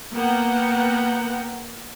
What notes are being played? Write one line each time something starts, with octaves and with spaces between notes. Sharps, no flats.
A#3 B3 A#4 F#5 G5